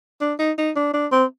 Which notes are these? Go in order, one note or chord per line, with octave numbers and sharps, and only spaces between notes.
D4
D#4
D#4
D4
D4
C4